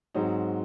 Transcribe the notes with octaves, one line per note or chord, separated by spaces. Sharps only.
G#2 F#3 C4 D#4